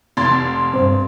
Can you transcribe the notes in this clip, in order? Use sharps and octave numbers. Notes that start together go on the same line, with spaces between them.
F1 C6 A6
G2 C4 C5